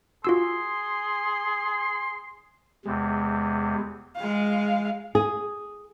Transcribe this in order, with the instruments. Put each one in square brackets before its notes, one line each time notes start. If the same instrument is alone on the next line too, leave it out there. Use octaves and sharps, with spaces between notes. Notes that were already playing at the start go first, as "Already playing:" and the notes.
[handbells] F4 F#4 E6 [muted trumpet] G#4 [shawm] C6
[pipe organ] E2 C3 [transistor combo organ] G#3
[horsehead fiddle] G#3 F5
[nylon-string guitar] G#4